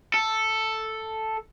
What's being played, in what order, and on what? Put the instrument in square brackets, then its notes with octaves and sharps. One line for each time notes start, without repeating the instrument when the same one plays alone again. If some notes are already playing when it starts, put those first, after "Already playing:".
[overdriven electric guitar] A4